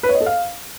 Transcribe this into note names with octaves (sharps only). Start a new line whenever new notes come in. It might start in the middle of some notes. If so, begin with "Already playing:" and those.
B4
C#5
D#5
A4
F5